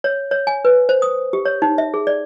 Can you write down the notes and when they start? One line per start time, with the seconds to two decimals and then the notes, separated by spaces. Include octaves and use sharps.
0.04 C#5
0.31 C#5
0.47 G#5
0.65 B4
0.89 C5
1.02 D#6
1.33 G4
1.45 C#5
1.62 D#4
1.78 E5
1.94 G#4
2.07 D5